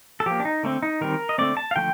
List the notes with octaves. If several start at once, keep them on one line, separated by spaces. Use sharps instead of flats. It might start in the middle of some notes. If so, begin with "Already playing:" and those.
A4
F3 A#3 G4
D4
D#4
D3 A3 C4
D#4
D#3 G3 C4 A#4
D#5
D3 A3 C4 D5
A5
F5
D3 F3 A3 G5